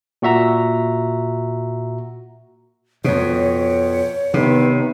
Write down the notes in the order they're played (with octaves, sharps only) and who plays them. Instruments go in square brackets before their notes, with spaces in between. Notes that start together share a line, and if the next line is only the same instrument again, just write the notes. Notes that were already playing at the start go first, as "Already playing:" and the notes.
[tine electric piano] A#2 F#4 E5 A#5
[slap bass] F2 B2 [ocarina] C#5
[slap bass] C3 [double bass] D#3 B3